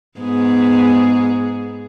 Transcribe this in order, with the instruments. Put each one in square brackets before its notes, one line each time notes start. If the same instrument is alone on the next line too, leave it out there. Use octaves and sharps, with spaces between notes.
[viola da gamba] G#2 B3 G#4